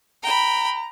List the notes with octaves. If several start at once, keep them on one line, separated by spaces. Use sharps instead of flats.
G5 A#5 B5